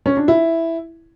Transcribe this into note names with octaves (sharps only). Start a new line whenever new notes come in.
C#4
D4
E4